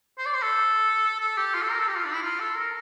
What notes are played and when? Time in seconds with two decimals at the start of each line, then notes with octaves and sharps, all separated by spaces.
0.18 C5
0.26 D5
0.34 C5
0.42 A4
1.20 A4
1.37 G4
1.54 F4
1.62 A4
1.71 A#4
1.79 A4
1.88 G4
1.97 F4
2.05 D4
2.14 E4
2.22 F4
2.40 A4
2.56 A#4